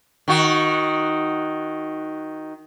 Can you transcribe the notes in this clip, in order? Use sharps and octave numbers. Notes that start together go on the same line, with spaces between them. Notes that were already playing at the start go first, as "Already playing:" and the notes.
D#3 F#4